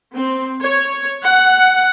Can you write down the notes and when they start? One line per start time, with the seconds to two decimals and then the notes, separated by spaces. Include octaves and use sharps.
0.12 C4
0.61 C#5
1.24 F#5